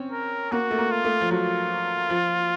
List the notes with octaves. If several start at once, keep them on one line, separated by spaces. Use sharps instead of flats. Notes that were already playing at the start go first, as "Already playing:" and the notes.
Already playing: C4 C#4
A#4
A#3 F#4
A3
A#3
F4
A3
F3
F#3 F4
F3